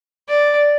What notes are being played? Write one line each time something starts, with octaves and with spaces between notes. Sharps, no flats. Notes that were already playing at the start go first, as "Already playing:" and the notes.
D5